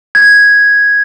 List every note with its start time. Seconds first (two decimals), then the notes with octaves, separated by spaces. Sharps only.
0.15 G#6